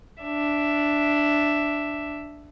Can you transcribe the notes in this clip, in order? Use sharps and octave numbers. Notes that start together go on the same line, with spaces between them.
D4 E5